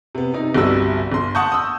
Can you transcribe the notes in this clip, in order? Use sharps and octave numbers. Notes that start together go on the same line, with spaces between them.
C3 B3
C3 D#4
G1 C2 G3 F#4 E6
G1 C6
F#5 A5 C#6 D#6 G6
D#6 E6